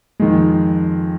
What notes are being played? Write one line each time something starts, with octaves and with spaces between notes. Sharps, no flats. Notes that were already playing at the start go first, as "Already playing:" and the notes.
F2 D#3 G#3